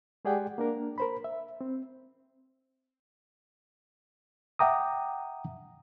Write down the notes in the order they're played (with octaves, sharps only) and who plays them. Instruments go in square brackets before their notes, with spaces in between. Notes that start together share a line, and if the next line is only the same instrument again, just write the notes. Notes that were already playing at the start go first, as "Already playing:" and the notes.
[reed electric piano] G#3 G4 G#4 D5 F#5 G5
A#3 D4 A#4
A#4 C5 B5
E5
C4
E5 F#5 G5 A#5 D6 D#6